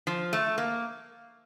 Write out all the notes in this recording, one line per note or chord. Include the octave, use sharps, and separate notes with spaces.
F3
A3
A#3